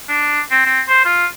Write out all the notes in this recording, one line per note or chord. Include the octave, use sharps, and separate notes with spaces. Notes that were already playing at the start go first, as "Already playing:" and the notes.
D4
C4
C4
C5
F4